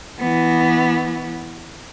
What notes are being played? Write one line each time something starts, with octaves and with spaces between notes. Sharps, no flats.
E3 B3